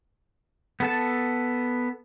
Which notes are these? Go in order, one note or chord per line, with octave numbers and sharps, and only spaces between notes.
B3 A4 A5